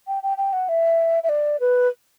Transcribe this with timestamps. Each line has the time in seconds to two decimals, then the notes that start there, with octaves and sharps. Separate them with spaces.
0.07 G5
0.23 G5
0.38 G5
0.53 F#5
0.69 E5
1.23 E5
1.29 D5
1.60 B4